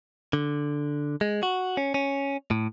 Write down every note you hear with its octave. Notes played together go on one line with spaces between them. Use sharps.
D3
G#3
F#4
C#4
C#4
A2